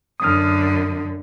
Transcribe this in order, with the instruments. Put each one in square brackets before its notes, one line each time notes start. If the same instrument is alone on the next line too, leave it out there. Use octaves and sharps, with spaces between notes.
[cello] F#2 D3 [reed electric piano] D#6 F6